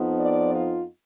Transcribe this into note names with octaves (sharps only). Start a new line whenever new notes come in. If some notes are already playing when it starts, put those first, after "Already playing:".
Already playing: F2 F3 B3 D#4
D5
F4